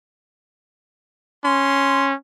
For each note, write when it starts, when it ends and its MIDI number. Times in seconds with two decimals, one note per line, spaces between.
1.45 2.14 61
1.45 2.08 84